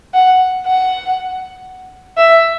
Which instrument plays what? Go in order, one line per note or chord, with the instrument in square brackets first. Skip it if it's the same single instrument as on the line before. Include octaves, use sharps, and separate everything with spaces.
[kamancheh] F#5
F#5
E5